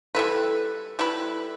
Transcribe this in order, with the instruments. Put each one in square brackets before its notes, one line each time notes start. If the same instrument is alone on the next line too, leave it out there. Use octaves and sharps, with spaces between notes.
[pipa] G3 E4 B4 [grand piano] A4
[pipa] G3 E4 B4